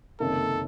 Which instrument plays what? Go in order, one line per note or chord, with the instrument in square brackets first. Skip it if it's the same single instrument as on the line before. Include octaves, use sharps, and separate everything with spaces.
[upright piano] F#1 F2 C3 D#3 A#3 [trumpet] A4